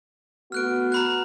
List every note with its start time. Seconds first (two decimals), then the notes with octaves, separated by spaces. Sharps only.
0.52 A3 B3 F#4 F6 F#6 D7
0.92 A#5 B5 F#6